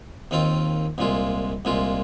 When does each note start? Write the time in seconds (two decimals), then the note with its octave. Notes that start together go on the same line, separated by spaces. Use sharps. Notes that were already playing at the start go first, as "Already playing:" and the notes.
0.31 D#2 D#3 C4 F4
0.98 C2 A#2 G#3 F4
1.65 C2 A#2 G#3 F4